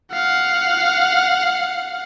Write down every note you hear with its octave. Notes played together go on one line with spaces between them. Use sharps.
F5 F#5